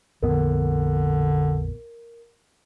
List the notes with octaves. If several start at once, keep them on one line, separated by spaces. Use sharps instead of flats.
A#1 F2 D3 B3 A#4